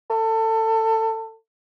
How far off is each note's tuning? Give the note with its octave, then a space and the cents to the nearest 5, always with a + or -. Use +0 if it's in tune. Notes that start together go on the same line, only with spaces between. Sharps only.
A4 +25